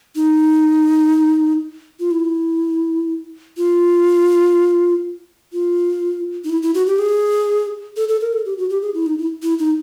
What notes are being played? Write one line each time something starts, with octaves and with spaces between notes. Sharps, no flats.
D#4
F4
E4
F4
F4
D#4
E4
E4
F#4
G4
G#4
A4
A4
A#4
A4
G4
F#4
G4
G#4
E4
D#4
E4
E4
D#4